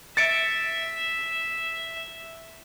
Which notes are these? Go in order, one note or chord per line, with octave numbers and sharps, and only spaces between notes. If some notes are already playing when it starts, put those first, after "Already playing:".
E5 A6 C#7 D7